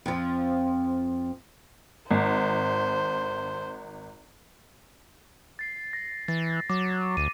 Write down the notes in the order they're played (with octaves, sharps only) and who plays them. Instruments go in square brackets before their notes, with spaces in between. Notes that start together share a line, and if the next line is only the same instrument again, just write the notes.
[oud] F2 F3
[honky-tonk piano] G#1 [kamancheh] C5
[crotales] A6 C7
A#6
[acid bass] E3 [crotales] A6
[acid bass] F#3 [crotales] D6
[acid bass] D2 [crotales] D#7